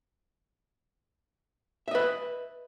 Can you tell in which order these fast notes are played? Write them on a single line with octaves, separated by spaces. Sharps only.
E5 D#5 B4